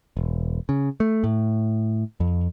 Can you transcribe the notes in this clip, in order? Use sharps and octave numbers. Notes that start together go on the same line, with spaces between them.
E1
C#3
A3
A2
F2